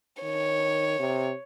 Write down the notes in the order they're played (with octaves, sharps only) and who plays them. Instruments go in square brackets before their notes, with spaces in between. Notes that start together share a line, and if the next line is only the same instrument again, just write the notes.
[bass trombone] D#3 [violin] C#5
[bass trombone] C3